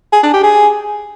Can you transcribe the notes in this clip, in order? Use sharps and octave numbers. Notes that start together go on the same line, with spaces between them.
G#4
D4
G4
G#4